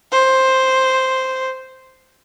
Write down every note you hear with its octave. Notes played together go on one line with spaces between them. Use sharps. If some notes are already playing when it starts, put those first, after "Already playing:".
C5